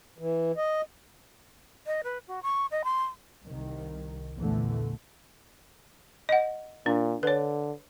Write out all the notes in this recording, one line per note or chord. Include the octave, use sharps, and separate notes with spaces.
E3
D#5
D#5
B4
F#4
C#6
D#5
C6
C2 D#3
A#1 E2 A#2 D3 E3 A3
D#5 F#5
A#2 D4
D3 B4 C#5